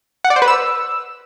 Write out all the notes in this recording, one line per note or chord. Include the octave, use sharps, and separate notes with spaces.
F#5
D5
C5
B4
E6